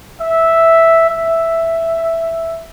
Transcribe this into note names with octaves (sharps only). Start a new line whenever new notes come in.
E5
E5